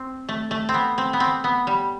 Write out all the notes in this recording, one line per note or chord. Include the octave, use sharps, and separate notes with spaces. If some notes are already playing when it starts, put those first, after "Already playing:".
Already playing: C4
A3
A3
C4
B3
C4
B3
C4
B3
G3